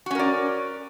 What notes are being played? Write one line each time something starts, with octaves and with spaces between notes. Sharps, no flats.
C#4 F#4 A#4 D5